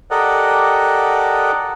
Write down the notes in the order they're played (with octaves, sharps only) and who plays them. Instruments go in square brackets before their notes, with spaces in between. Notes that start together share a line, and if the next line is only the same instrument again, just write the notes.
[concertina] G4 A4 A#4 D5 D#5 F#5